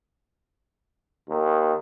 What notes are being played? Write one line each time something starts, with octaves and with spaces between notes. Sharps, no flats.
D#2